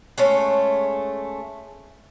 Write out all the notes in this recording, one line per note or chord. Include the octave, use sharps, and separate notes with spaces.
G#3 A3 C#4